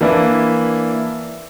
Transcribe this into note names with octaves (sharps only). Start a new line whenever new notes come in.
E3 A#3 D4 E4